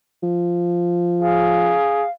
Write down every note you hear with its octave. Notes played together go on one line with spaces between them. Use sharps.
F3
G#4 F5